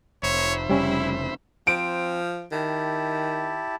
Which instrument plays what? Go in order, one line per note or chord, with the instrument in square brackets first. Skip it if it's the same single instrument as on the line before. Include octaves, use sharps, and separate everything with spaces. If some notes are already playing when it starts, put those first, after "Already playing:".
[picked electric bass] F1 [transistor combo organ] C5 E5 B5 [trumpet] C#5
[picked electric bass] F1 C#3 [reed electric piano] G3 C#4 [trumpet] E4
[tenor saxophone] F3 [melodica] C4 C5 [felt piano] D7
[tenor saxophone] D#3 [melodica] E4 G4 A5